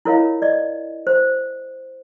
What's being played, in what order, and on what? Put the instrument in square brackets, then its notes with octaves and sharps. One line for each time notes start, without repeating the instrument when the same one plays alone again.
[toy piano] E4 F4 A#4 C#5 D#5 F5
D5 D#5
C5